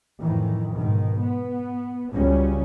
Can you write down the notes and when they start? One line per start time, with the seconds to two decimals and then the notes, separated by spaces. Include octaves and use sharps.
0.22 F2 A2 D#3 E3
0.76 G#2 B2 D#3
1.21 B3
2.14 C#2 C#3 F#3 G3 C#4